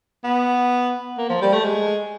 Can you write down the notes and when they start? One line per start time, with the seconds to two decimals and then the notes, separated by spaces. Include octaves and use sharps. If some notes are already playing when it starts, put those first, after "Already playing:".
0.24 B3
1.18 A#3
1.29 F3
1.41 G3
1.53 A3
1.64 G#3